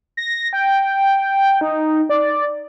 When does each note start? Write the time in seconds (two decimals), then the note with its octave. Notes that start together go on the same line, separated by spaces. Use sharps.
0.17 A#6
0.53 G5
1.61 D#4
2.09 D5